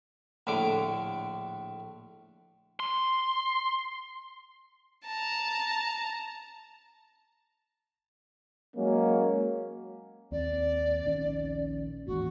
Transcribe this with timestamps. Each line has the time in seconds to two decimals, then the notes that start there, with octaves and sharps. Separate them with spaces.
0.47 A#1 A2 D3 D6
2.80 C6
5.04 A5 A#5
8.76 F#3 G#3 A#3 C#4
10.32 D#2 C4 D5
11.05 A#1 D#3 C#4
12.07 A1 D#2 G#2 F#4